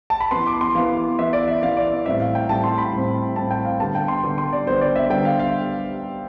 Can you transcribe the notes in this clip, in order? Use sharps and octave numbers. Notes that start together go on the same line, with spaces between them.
A5
B5
E3 B3 C6
D6
C6
E3 B3 F5
E3 B3 E5
D5
E5
E3 B3 F5
D5
E5
A2 G3 C4 E5
F5
G5
A2 G3 C4 A5
C6
B5
A2 G3 C4
A2 G3 C4 A5
G5
F5
D3 G3 B3 A5
G5
C6
D3 G3 B3
C6
D5
D3 G3 B3 C5
D5
E5
D3 G3 B3 G5
F5
F5